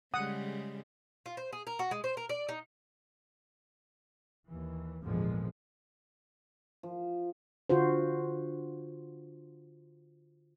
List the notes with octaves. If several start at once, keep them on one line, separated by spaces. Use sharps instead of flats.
C#3 G3 G#3 F#5 D#6
F4
C5
G#4
A#4
F#4
G#3
C5
A#4
D5
D#4
D#2 E3
G#1 E2 A#2 D3 F3 G#3
F3
D3 F4 F#4 C5